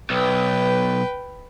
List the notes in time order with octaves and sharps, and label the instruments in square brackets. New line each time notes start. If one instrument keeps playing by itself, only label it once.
[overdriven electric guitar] B1 [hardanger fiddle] B4 G5